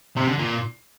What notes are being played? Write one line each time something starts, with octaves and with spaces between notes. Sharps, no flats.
C3
D3
A#2